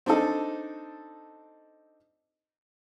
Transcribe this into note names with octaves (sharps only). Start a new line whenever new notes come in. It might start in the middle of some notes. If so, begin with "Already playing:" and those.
C4 D4 D#4 A4